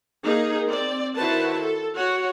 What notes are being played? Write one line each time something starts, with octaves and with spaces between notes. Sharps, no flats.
A#3 D#4 G#4 A#4
C4 D5
D#3 E4 F#4 B4 C5 A5
A4
F#4 C#5 F#5